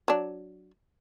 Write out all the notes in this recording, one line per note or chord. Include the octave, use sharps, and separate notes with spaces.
F#3 D4